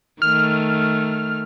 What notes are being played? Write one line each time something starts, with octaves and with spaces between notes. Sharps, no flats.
D#3 A3 F6